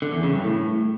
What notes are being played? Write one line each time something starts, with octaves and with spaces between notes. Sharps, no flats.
D3
E2
C#3
G2
A2